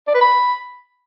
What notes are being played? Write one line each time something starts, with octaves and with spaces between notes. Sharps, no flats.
D5
B4
B5